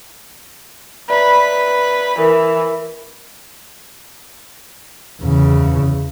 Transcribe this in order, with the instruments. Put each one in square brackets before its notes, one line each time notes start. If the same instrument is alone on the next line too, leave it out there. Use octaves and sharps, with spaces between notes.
[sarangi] B4 [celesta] D5 E5 A#5
[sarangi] E3 [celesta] A#4
[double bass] E2 C#3